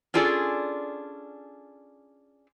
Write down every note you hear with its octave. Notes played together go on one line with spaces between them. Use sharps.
C#4 D4 F4 G#4 A4 D5